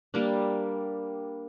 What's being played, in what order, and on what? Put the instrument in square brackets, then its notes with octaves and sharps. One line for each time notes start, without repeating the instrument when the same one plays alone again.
[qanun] G3 A#3 D4